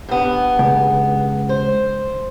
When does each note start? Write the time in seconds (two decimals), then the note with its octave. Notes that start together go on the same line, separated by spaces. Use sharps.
0.09 G2 B3
0.59 C#2
1.49 C5